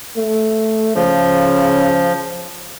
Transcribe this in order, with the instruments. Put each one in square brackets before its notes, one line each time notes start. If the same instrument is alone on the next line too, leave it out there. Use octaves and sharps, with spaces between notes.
[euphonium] A3
[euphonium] C#3 [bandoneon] F3